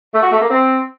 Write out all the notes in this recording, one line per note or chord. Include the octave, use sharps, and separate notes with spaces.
A3
F#4
A3
A#3
C4